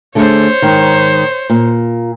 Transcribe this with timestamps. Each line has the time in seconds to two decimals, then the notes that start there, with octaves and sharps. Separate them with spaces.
0.15 D3 A3 G#4 C5 C#5
0.62 G#2 D#3
1.50 A#2